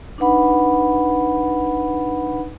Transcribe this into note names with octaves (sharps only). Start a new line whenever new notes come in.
D4 D#4 B4 F#5 B5